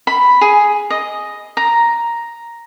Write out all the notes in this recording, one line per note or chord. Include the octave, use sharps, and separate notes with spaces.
B5
G#4
D#5
A#5